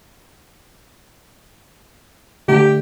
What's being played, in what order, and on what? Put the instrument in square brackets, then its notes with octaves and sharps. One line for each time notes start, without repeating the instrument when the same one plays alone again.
[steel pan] D3 A3 [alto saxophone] G4